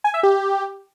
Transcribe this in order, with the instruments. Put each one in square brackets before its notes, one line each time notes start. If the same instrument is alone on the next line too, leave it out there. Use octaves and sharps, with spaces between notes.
[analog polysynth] G#5
E5
G4